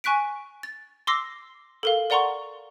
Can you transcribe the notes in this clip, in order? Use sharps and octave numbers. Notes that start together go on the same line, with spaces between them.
G#5 C#6 F#6 B6 D7
A6
C6 D6 E6 A#6 C7
A4 A#4 F5
A#4 D5 F#5 A#5 C6 C#6